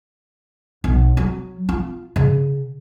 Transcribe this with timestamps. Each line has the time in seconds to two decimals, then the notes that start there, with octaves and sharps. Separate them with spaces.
0.84 B1
1.17 F#3
1.69 F4
2.16 C#3